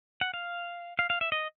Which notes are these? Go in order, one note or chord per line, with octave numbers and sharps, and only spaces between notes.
F#5
F5
F5
F5
E5
D#5